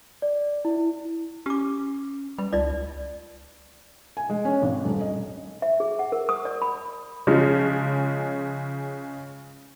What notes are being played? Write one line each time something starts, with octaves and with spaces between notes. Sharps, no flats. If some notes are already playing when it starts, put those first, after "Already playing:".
D5
E4
C#4 G4 D6
G3 B4
C#2 D#4 D5
G#5
G#3
C#4
G#1
D#1
D#5
E5
G#4
F#5
A#4
D#6
D5
B5
C#3 F3 G#3 C#4